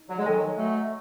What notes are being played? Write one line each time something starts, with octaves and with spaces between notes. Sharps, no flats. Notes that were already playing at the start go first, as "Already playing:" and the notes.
Already playing: D#4
F#3
G#3
D#3 F#3 A4 D#5 G#5
F#3 A3